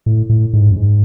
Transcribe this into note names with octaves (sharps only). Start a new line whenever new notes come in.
A2
A2
G#2
F#2
G#2